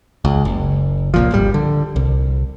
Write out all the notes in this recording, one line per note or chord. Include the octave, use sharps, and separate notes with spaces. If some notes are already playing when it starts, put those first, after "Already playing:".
C#2
F#1
C2 A#2 F3
D1 G#1 G3
D3
C2